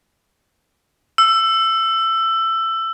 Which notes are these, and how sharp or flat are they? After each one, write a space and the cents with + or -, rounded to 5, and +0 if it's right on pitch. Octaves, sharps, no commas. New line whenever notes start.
E6 +15